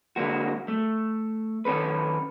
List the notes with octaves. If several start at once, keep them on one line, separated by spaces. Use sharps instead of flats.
D3 G#3 A#3 F#4
A3
D#3 C#4 A4 B4